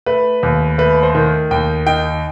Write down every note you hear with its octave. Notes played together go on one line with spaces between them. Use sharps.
A3 B4
D#2
A3 B4
C5
D#3
D#2 G5
D#4 G5